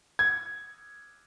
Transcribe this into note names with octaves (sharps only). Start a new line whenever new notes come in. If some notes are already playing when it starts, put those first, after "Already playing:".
G#6